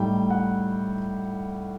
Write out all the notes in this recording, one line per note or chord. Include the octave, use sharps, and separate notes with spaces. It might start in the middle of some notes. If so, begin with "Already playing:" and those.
Already playing: A2 G3 D#4 G5
F#5